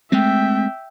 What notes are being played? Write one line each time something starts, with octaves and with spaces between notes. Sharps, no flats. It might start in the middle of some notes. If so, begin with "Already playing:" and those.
G#3 A3 C4 E5 G5